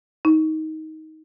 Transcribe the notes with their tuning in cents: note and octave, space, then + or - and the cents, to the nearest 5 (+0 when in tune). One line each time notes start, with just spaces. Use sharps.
D#4 +20